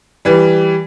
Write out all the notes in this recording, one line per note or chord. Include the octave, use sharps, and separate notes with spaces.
E3 G3